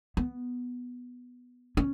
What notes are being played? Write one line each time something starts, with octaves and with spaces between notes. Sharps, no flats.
B3
C#4